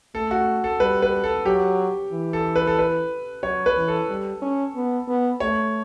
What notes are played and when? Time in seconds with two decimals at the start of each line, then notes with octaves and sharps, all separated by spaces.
0.15 A3 A4
0.31 F#4
0.64 A4
0.80 G3 B4
1.02 B4
1.24 A4
1.45 F#3 G4
2.12 E3
2.33 A4
2.56 B4
2.67 A4
2.79 B4
3.43 F#3 C#5
3.66 B4
3.77 E3
3.88 A4
4.09 G3
4.42 C#4
4.75 B3
5.08 B3
5.40 A3 C#5